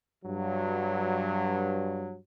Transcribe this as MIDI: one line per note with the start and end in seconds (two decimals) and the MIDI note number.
0.25 2.17 43
0.25 2.17 54